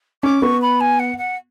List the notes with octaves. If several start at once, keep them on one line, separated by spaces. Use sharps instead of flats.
C#4 D6
B3 C#6
B5
G#5
F#5
F#5